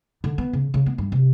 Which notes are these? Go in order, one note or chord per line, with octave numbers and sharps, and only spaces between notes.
D3
B3
C#3
C#3
B3
G2
C3